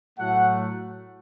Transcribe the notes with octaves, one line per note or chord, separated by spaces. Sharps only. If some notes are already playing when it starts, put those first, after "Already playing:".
A2 F#3 A3 F#5